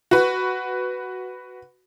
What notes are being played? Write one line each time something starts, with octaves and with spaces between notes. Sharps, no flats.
F#4 B4